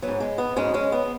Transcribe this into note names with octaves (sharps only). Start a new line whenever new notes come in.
G#2 F#3 B3
G#3
B3
G#2 F#3 G#3 C#4
G#3 C#4
B3